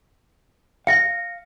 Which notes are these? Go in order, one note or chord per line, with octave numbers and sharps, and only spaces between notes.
F5 A#6 C#7